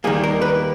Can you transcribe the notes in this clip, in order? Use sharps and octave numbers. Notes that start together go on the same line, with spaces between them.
D#2 D#3 G3 A#3 G#4
A#4
B4